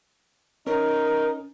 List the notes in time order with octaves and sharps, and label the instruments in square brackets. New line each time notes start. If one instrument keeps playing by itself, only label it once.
[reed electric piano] C#4 [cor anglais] D#4 [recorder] A#4